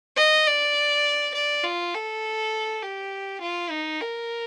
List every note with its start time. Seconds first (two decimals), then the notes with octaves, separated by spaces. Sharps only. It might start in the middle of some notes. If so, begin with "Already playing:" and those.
0.17 D#5
0.47 D5
1.34 D5
1.64 F4
1.94 A4
2.83 G4
3.42 F4
3.71 D#4
4.01 A#4